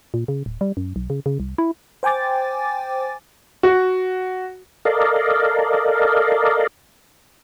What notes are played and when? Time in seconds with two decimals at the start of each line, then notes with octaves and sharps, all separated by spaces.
0.14 A#2
0.28 C#3
0.46 D1
0.61 G3
0.77 F#2
0.96 B1
1.10 C#3
1.26 C#3
1.40 C2
1.58 E4
2.03 C5 G5 G#5 D6 A6
3.63 F#4
4.85 A4 A#4 D5 D#5 F5